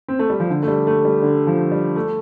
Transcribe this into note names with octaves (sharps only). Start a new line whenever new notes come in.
C4
A3
G3
F3
D3
A3
G3
A3
G3
D3
F3
G3
A3